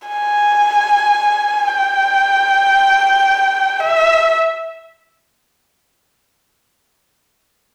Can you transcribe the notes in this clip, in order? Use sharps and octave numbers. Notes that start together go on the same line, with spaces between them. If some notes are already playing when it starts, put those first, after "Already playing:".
G#5
G5
E5